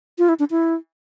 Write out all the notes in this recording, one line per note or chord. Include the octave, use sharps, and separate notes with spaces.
F4
E4
D4
E4